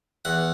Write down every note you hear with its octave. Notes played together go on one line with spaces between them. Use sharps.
E2 F#5